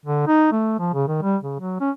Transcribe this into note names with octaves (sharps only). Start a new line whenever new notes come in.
D3
D#4
A3
F3
C#3
D#3
G3
C#3
F#3
C#4